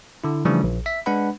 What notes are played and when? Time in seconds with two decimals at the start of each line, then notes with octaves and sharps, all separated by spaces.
0.24 D3 E4
0.45 C#3 E3 F3 G3 A3 D4
0.64 A#1
0.86 E5 B6
1.06 G#3 D4 B4 F#5 B5